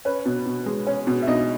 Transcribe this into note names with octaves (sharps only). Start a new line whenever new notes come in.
C#4 B4
B2
B2
G#3
C#4
B2
E5
B2 D#4 D#5